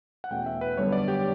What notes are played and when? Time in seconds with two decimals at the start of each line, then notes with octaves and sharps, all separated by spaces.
0.24 F#5
0.31 E2 B2 A3 C#4 G5
0.46 E5
0.61 B4
0.77 F#2 D3 G3 B3 C#5
0.93 D5
1.08 G4